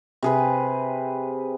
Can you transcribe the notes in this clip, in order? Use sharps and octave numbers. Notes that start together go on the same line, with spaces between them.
C3 G#4 B4